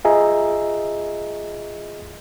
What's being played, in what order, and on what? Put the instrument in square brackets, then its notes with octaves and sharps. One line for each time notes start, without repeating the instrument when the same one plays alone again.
[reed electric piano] F4 G#4 D#5 E5 A#5